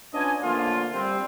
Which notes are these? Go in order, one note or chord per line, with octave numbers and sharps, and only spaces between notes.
C#4 D4 F4 B4 D#5 G#5
D3 F3 A3 A#3 F4
G3 C4